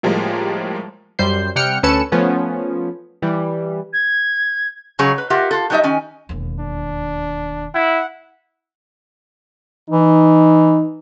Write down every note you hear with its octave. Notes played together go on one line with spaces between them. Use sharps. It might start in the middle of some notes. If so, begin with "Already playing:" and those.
A2 F3 G3 G#3 A#3
F#2 G3 C5 G6 C7
C3 G3 F#5 G5 F6 C#7
D2 C#4 A4 B4 C#7 E7
F3 A3 B3 C#4
E3 G3
G#6
C#3 F#3 G#4 C#5
B4
F4 G4 A#4 E5 F#5
F4 A4
F#3 G3 D#4 A4 D#5 E5
D#3 C#4 G#5
E1 D#2
D4
E4 F#5
E3 D#4